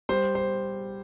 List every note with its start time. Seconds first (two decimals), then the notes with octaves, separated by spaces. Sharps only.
0.09 G3 C5
0.35 C5